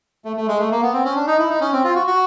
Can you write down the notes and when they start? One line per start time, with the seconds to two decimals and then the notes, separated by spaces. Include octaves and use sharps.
0.25 A3
0.37 A3
0.48 G#3
0.59 A3
0.71 A#3
0.83 B3
0.93 C4
1.05 C#4
1.16 D4
1.27 D#4
1.39 E4
1.49 D#4
1.61 C#4
1.73 C4
1.84 F4
1.95 F#4
2.07 F#4